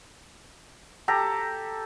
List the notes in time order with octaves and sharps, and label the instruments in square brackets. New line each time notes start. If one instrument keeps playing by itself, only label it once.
[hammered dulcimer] G4 A4 A#5